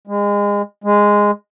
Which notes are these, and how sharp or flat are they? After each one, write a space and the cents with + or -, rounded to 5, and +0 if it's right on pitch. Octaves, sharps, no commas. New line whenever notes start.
G#3 -30
G#3 -10